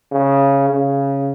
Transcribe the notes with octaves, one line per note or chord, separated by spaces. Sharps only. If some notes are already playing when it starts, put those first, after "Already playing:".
C#3
C#3